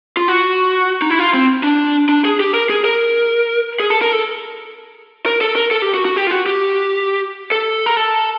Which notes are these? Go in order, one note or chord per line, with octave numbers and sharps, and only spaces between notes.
F4
F#4
D#4
E4
F4
C4
D4
D4
G#4
G4
A#4
G#4
A#4
G#4
A4
A#4
A4
A#4
A4
A#4
A4
G4
F#4
F#4
G4
F4
F#4
G4
A4
A#4
A4